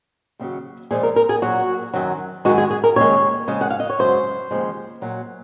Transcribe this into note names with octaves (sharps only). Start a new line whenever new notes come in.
D#2 C#3 F#3
A#2 F3 G#3 G#4
A#4
A#4
G#4
A#2 F#3 F#4
F#2 D#3 F#3
F#2 D#3 G#3 F#4
G#4
G#4
A#4
D#2 C#3 G#3 C#5
F2 C#3 G#3
F#5
F5
D#5
C#5
F#2 C#3 G#3 C5
D#2 C#3 F3 G#3
A#2 F#3